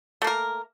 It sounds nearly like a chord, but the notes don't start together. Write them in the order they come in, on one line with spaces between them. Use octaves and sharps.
A3 A#3 A#4